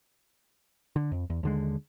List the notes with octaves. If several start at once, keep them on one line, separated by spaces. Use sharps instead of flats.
D3
F2
E2
D#2 D3 G#3